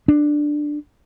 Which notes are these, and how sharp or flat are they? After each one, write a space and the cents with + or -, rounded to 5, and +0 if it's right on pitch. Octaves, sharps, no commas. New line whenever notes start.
D4 +10